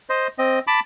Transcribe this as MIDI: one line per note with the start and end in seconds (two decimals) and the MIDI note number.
0.10 0.28 72
0.10 0.28 75
0.38 0.59 60
0.38 0.59 75
0.67 0.80 81
0.67 0.80 83
0.67 0.80 86